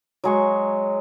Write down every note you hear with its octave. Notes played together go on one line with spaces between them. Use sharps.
F#3 G#3 C#6